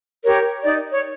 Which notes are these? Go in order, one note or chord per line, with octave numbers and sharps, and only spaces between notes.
G4 A#4 C#5
D#4 D5
C#5